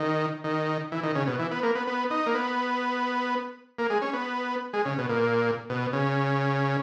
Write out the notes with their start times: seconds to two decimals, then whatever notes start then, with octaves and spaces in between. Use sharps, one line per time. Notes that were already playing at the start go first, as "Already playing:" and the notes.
Already playing: D#3
0.44 D#3
0.92 E3
1.03 D#3
1.16 C#3
1.27 B2
1.39 E3
1.52 B3
1.63 A#3
1.75 B3
1.87 B3
2.11 D#4
2.26 A#3
2.35 B3
3.79 A#3
3.90 G#3
4.02 C#4
4.14 B3
4.73 G#3
4.85 C#3
4.98 B2
5.09 A#2
5.70 B2
5.93 C#3